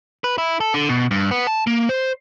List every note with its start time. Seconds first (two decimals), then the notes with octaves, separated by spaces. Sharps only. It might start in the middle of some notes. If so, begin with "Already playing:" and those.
0.24 B4
0.38 E4
0.61 A4
0.74 D3
0.89 B2
1.11 G2
1.31 B3
1.47 A5
1.67 A#3
1.89 C5